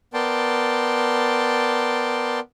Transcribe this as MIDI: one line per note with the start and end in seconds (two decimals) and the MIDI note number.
0.14 2.40 59
0.14 2.40 70
0.14 2.40 74
0.14 2.40 79
0.14 2.40 81
0.14 2.40 84